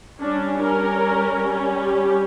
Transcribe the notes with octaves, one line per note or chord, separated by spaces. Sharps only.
G3 C#4 D4
A#4
G4